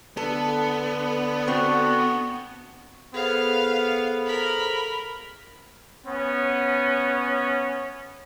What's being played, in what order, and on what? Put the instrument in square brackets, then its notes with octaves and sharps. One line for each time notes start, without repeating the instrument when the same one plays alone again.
[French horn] D3 [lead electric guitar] B3 [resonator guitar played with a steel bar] A4
[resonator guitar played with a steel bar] C4 [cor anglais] F#4
[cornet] B3 [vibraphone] G#4 A4 C5 [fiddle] F5
[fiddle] A#4 B5
[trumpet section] B3 C#4